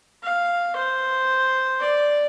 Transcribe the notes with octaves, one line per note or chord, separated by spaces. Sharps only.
F5
C5
D5